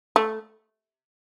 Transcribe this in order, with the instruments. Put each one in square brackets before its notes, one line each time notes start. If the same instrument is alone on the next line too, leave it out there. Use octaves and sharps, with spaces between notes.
[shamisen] A3